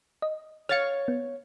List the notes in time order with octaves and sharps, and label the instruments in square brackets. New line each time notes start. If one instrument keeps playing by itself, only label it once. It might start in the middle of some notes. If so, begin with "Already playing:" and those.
[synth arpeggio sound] D#5
[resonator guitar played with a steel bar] C#5 F5 [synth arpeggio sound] F6 A6 C#7
[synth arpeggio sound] B3